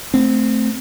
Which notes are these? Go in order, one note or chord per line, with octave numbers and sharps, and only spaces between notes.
A3 C4